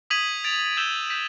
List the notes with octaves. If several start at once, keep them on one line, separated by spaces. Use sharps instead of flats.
D#6 G#6 B6 D#7 F#7
A6 D7 F7
E6 G6 B6 E7 G7
G6 B6 D#7